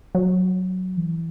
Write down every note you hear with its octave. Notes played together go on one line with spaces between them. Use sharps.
F#3
E3